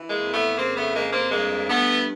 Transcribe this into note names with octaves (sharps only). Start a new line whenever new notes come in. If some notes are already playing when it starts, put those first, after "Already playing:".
Already playing: E3
G#3 A#3
F2
A3 B3
C#3 A#3 C4
A3 B3
F2 G#3 A#3
A#3 C4
G2 G#3 A#3
G2 A3 B3